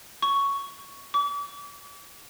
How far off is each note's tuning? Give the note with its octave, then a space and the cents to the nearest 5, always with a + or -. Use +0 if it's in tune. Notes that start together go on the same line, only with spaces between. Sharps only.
C#6 +5
D6 -40